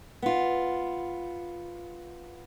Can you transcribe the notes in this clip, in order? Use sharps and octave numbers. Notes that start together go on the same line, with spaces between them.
B3 F4